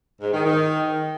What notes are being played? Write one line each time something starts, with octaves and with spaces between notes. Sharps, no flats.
G#2
D#3
D#3